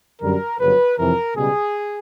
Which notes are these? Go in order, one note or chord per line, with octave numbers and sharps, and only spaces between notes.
F#2 D3 G3 A#4
G1 F#2 C#3 F#3 B4
F2 C3 E3 A#4
C#2 B2 G3 G#4